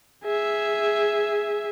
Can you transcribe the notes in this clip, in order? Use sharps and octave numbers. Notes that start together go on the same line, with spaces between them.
G#4 E5